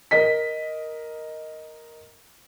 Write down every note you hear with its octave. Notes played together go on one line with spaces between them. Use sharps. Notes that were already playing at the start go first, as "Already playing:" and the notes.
A#4 D#5 B6